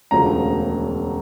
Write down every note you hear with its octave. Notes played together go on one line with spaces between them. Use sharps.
E1 D2 C#3 F3 A#5